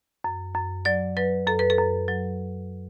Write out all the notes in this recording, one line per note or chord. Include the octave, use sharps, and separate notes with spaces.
F#2
F#2
F#3 D5
F#3 B4
F#2 A4
B4
A4
F#2
F#3